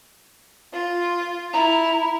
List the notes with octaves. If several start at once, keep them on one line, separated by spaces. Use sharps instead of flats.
F4
E4 A#5